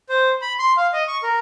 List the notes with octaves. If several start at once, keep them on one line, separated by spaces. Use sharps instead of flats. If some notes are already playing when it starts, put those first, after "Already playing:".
C5
B5
C6
F5
D#5
C#6
A#4